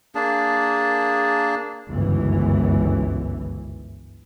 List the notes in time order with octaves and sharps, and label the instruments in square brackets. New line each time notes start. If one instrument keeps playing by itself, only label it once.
[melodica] A#3 D4 G#4 A5
[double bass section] G1 C#2 F#2 E3